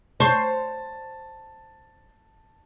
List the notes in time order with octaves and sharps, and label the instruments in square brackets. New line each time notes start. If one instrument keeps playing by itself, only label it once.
[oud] C5 C#5 [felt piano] A5